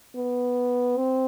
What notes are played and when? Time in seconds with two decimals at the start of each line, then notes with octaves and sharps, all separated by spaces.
0.16 B3
0.97 C4